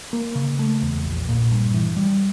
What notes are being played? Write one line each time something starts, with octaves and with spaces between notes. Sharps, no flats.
A#3
C#3
A3
E2
A#1
A#2
G2
E3
G3